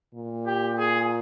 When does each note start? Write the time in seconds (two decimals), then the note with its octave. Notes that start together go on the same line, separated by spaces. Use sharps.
0.15 A#2
0.46 G4
0.78 G#4